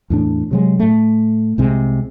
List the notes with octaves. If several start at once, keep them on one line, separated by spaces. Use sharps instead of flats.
E2 A2 D4
C3 F#3 G#3
A2 A3
C2 C3 G#3